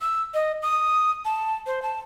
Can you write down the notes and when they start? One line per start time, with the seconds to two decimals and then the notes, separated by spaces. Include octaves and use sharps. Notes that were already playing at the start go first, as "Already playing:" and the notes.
0.01 E6
0.34 D#5
0.62 D#6
1.25 A5
1.67 C5
1.82 A5